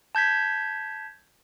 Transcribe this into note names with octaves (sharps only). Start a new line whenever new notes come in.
A5 G6 G#6 B6